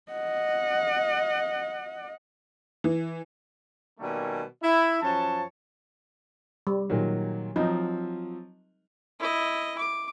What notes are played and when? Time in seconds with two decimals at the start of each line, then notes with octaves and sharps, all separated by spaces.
0.12 D#5 F#5
2.84 E3
3.99 B2 D#3 G3 A3 A#3 C#4
4.63 E4
5.01 F#2 F3 C#5 A5
6.67 G3
6.90 A#2 D#3 F#3
7.56 F3 F#3 C4 D#4
9.20 E4 D#5
9.79 D6